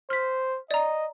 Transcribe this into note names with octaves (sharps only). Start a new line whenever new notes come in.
C5 F6 B6
D5 D#5 A#5